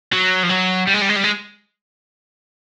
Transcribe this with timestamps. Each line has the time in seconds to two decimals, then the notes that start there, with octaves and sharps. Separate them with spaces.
0.13 F#3
0.43 F3
0.49 F#3
0.87 G3
0.94 G#3
1.01 G3
1.09 G#3
1.16 G3
1.24 G#3